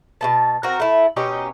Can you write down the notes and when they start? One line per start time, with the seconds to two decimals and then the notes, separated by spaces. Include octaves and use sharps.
0.21 B2 B3 A5
0.63 C4 F#4 A#4
0.80 A3 E4
1.16 B2 C#4 D#4 G4